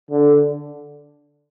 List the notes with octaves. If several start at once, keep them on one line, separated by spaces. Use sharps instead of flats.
D3